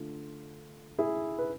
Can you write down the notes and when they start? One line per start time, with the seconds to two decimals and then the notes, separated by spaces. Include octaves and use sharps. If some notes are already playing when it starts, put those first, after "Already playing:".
Already playing: D3 A3 F4
0.98 E4 G#4
1.39 B4